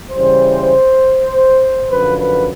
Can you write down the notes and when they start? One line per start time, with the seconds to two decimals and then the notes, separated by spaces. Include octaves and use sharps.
0.11 C#3 E3 G3 C5
1.89 F#2 D3 F3 B4
2.18 B4